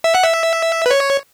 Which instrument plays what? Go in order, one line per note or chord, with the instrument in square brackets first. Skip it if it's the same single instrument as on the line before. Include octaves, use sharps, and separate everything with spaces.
[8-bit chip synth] E5
F#5
E5
B4
C#5